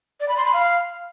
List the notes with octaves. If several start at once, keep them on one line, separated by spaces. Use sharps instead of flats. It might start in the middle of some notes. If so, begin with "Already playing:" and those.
D5
B5
C6
B5
F5